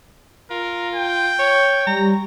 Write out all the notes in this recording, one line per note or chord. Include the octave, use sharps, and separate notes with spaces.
F4 A#4
G5
C#5
G3 A#5